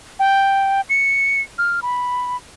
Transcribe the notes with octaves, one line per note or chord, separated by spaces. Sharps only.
G5
C#7
F6
B5